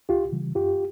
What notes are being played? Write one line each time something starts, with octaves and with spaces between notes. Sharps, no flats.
C#2 F4 G4
C#3 E3 G3
F#2 F4 G4